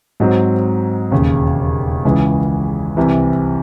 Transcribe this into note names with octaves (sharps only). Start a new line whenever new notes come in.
G#2 F#3 C4
E1 D#2 C#3
C#2 C#3 E3 G#3
C2 C3 E3